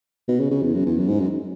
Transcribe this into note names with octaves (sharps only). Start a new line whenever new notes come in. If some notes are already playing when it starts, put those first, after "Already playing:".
B2
C#3
C#3
E2
F#2
E2
F#2
G#2
F#2